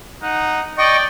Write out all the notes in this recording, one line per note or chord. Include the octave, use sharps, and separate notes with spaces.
D#4 F#5
D5 D#5 G5 C#6